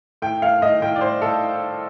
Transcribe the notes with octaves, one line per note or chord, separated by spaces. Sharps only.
A2 G5
A2 F5
A2 D#5
A2 G5
D5
A2 C5
A2 A4